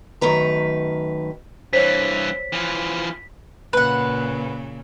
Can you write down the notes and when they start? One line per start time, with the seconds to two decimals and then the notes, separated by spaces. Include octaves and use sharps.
0.21 F#2 D#3 A3 B4 A#5
1.73 G2 E3 C5 C#5 B6
2.53 E3 F3
3.73 A#2 C#3 B4 F#5